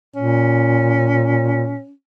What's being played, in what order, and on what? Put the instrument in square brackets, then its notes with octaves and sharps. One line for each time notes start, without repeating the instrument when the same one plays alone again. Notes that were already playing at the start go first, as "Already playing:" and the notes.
[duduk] A#2 [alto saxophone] C#4